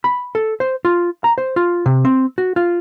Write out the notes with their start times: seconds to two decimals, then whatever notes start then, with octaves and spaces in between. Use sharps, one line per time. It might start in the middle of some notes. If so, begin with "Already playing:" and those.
0.04 B5
0.35 A4
0.60 C5
0.85 F4
1.24 A#5
1.38 C5
1.56 F4
1.86 C3
2.05 C4
2.38 F#4
2.56 F4